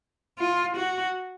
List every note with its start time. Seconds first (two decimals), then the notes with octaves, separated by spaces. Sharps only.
0.39 F4
0.76 F#4